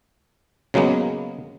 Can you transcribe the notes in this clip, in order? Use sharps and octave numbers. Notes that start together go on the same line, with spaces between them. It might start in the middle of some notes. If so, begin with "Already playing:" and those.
C#3 F#3 G#3 A#3 B3